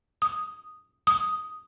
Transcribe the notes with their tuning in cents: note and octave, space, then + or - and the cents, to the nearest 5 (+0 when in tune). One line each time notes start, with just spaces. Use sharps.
D#6 +0
D#6 +5